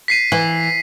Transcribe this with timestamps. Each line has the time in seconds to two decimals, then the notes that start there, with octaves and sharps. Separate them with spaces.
0.08 B6 C7 D#7
0.32 E3